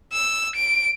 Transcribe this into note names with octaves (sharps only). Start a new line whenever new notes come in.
E6
D7